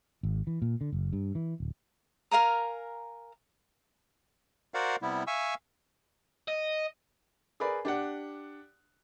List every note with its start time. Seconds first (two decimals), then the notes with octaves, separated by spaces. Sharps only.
0.23 G#1
0.47 E3
0.62 A#2
0.81 D3
0.92 F#1
1.13 G2
1.35 E3
1.60 D1
2.31 A#4 F5 G#5 A#5
4.74 F#4 A#4 C5 D5 F5 F#5
5.02 C3 G3 B3 E4
5.27 E5 F5 G#5 C#6 E6
6.48 D#5
7.60 G#4 A#4 B4 D5 B5
7.85 D4 G4 F#5